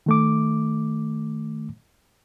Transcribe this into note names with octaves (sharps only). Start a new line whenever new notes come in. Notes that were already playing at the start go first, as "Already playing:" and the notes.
D#3 A3 D6